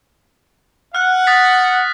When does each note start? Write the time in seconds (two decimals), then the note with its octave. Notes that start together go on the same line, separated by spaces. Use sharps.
0.95 F#5 F6 F#6
1.27 D#6 A6 B6